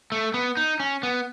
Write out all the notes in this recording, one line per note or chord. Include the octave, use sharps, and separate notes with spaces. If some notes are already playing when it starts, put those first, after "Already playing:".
A3
B3
D#4
C#4
B3